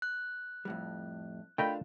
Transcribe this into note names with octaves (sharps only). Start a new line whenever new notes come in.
F#6
F2 A2 G3
A3 D4 F4 A#4 D#5 G5 B5